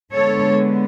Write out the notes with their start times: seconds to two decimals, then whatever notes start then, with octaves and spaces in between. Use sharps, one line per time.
0.13 D3 G#3 B3 A4 C#5